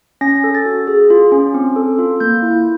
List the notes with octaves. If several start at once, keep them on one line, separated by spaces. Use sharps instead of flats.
C#4 A#6
A4
A6
F#4
G#4
F4
C#4
C4
A4
F4
A#3 G6
E4